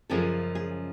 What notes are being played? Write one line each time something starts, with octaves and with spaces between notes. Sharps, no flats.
F#2 C#3 F3 G#3 C#4 A4
G#4